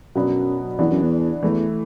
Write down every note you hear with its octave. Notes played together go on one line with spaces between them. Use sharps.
F#2 B2 F#3 B3 D4
E2 E3 B3 D4
F#2
E2
E2 E3 A3 E4